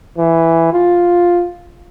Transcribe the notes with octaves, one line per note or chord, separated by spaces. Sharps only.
E3
F4